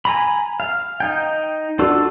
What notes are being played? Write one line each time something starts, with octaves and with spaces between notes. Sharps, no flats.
G#5 A#5 B5
F5
D#4 G5
D4 F4 F#4 A4